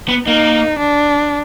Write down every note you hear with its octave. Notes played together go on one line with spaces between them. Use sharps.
B3
A#3 D#4
D4